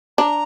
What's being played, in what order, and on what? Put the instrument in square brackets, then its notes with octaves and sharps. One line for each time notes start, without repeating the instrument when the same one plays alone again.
[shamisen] D4 [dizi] A#5